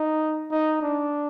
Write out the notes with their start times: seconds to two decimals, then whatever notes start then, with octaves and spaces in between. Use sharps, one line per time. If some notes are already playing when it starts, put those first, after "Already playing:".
Already playing: D#4
0.51 D#4
0.81 D4